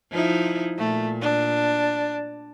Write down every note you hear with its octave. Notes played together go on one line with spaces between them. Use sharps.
F3 D#4 E4
A#2 A3
D4